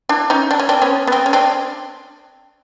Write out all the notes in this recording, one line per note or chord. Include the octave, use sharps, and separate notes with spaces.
D4 E4
C#4 D#4
D4
C#4
C4 D4
B3 C#4
B3
C4
C#4
C4 D4